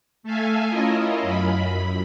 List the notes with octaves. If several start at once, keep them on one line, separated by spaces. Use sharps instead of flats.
A3 A4 E5 F5 G#5
C#4 E4 F4 A#4 D#5
F#2 B5